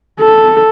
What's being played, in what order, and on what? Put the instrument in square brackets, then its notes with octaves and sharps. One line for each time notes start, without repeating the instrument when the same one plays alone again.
[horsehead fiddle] A4